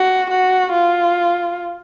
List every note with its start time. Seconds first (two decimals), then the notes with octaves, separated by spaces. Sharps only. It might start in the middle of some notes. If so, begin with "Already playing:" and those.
Already playing: F#4
0.31 F#4
0.72 F4